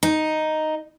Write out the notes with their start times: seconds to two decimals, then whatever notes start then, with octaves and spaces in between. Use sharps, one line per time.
0.03 D#4